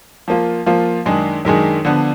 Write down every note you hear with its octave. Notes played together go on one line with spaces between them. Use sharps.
F3 A#3 F4
F3 A#3 F4
F#2 D#3 G#3 D4 G#4
F#2 D#3 G#3 D4 G#4
D3 F3 B3 D4